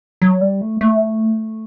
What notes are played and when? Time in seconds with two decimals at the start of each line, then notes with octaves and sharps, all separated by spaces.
0.22 F#3
0.41 G3
0.61 A3
0.81 A3